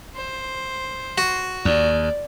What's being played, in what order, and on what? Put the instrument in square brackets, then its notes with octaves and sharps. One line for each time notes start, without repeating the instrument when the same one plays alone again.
[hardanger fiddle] C5
[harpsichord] F#4
[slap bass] D#2 [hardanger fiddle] D5